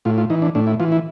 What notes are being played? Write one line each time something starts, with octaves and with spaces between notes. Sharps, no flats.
A2 F4
F4
E3 D#4
D4
A2 D4
E4
E3 F4
E4